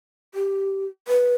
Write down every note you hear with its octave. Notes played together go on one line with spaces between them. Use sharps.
G4
B4